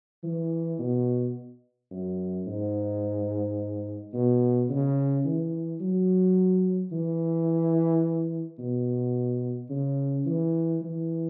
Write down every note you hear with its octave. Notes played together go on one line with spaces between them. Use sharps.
E3
B2
F#2
G#2
B2
C#3
E3
F#3
E3
B2
C#3
E3
E3